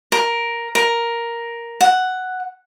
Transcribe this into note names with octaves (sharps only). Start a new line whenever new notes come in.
A#4
A#4
F#5